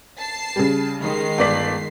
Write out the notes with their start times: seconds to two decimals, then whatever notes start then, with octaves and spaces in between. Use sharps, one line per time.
0.19 A5 C7
0.56 C#3 G3
1.02 D#3 G#3 C7
1.38 G1 D5 B6